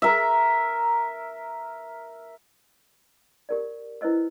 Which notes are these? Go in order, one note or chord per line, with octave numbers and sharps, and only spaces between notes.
A#4 E5
G4 A#4 D5
E4 B4 C5 D#5 E6